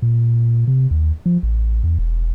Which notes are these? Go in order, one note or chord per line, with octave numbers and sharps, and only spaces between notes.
A#2
C3
D#2
F3
A1
E2
E1